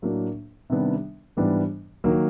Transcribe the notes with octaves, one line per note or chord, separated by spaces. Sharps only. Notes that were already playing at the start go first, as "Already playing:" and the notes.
A2 F#3 A#3 D4
C3 D#3 G3 B3 D4
G#2 E3 G3 B3 D4
D#3 F#3 A#3